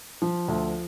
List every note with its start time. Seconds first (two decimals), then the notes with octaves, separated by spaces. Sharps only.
0.22 F3
0.48 D2